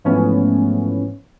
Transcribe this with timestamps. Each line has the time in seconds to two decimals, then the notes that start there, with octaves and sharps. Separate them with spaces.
0.04 G#2 E3 F3 A3 B3 C#4